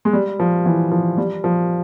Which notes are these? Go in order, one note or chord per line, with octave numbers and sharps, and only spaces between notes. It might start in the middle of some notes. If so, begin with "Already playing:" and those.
G#3
G3
F3
E3
F3
G3
F3